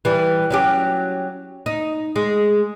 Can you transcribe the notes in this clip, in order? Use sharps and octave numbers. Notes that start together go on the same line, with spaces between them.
E3 G3
F#3 C#4 G4
D#4
G#3